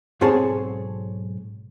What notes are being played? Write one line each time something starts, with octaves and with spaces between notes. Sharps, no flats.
B1 G#2 C4 G#4 C#5 A5